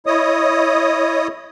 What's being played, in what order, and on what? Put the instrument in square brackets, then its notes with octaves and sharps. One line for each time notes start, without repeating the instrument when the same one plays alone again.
[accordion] E4 C#5 D#5 D#6